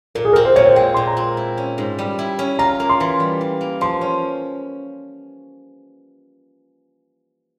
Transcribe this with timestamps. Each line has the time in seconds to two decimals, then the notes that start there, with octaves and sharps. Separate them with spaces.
0.15 A#2 A#4
0.25 G#4
0.33 A#4
0.36 C4
0.45 C5
0.56 A#2 C#5
0.66 C5
0.76 G#3 G5
0.94 A#2 C6
1.07 A#5
1.17 C4
1.37 E4
1.57 C#4
1.78 G#2
1.99 G3
2.19 E4
2.39 C#4
2.59 F4 A#5
2.80 A#3
2.90 C6
3.00 E3
3.20 G3
3.41 F4
3.61 A#3
3.81 F3 C6
4.01 C#4